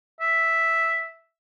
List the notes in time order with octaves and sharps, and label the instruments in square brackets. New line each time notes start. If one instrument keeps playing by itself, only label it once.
[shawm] E5